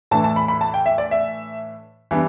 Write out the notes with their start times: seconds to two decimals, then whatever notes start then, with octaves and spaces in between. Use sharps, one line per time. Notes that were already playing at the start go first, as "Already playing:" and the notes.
0.11 A2 E3 A3 D4 A5
0.24 A5
0.36 B5
0.48 B5
0.61 A5
0.74 G5
0.86 E5
0.98 D5
1.11 E5
2.11 E3 G3 B3 D4